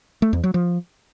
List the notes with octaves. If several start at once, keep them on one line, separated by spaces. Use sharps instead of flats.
A3
E2
F#3
F3